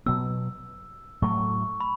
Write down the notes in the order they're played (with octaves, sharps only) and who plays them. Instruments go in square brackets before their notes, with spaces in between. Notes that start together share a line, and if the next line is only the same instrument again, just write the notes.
[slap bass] B2 F#3 B3 [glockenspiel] E6
[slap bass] A2 F#3 A3 [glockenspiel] C#6
[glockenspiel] B5